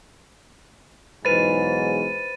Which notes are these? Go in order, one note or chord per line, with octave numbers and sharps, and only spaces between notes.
B1 E2 G#2 B4 C5 B5 A6 D#7